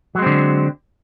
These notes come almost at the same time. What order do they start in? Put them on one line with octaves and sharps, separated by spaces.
F#3 G#3 C4 D3